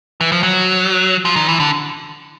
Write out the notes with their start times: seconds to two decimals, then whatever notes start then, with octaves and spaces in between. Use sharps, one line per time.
0.21 E3
0.32 F3
0.43 F#3
1.25 F3
1.36 D#3
1.48 E3
1.60 D3